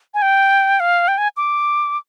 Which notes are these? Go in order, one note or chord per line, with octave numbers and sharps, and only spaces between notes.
G#5
G5
F5
G5
G#5
D6